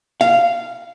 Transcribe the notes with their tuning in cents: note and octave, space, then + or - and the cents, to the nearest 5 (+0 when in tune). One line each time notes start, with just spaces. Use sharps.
F5 -15